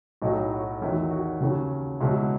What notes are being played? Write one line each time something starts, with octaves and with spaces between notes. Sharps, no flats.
B1 A2 F#3 D#4
F#4
E2 D#3 F#3 E4
F#4
D#2 C#3 F#3
C#2 B2 F#3 E4